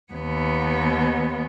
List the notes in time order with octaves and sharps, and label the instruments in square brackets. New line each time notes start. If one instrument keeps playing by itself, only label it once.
[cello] D#2 B3